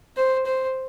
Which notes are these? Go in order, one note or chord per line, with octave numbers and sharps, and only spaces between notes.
C5
C5